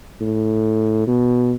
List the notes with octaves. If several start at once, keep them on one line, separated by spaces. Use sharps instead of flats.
A2
B2